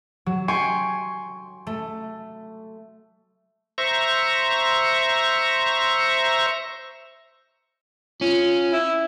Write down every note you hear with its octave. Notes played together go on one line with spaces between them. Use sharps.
F#3
G5 G#5 C6 C#6
A3
C5 E5 A#5 C#6
C#4 F4
E4